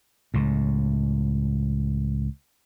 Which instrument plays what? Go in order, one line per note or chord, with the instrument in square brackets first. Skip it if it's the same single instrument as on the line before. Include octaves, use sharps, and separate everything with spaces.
[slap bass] C#2 A2